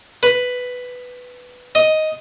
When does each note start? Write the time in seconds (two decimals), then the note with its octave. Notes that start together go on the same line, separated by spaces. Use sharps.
0.23 B4
1.75 D#5